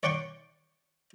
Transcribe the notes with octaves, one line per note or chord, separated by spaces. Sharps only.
C#5 D5 F#5 G5 C6 C#6